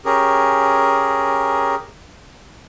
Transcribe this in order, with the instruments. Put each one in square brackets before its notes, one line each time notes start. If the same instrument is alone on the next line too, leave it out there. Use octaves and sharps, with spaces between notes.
[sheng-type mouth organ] C#4 G4 G#4 A#4